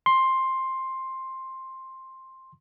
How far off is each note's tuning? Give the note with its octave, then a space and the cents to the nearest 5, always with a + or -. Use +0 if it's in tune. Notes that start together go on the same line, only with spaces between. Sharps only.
C6 +10